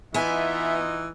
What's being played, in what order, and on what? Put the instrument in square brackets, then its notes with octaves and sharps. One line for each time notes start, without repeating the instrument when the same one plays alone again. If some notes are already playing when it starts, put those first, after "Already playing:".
[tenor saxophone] E3 [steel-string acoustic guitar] B3 G#5 [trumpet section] D#4 F4 D#5 [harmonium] E5